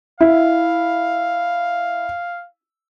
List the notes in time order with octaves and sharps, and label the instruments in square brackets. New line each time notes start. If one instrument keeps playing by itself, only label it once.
[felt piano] E4 [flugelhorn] F5